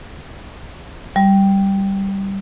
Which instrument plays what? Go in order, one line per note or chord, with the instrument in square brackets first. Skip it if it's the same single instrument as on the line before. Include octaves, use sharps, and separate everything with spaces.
[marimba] G3